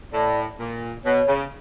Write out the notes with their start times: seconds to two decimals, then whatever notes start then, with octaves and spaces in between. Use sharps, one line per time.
0.12 A2 D5
0.59 A#2
1.04 B2 C#5
1.27 C#3